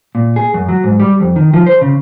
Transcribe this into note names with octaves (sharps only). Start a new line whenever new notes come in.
A#2
G#4
F#2
F#3
G#2
G3
F2
D#3
F3
C5
C#3